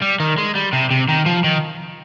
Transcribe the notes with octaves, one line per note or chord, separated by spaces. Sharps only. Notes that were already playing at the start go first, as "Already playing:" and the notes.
G3
D#3
G#3
G3
C3
C3
D#3
F3
D#3